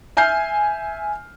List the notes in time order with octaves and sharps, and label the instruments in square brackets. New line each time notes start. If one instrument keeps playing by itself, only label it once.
[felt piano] E5 G#5 F6 G6 C7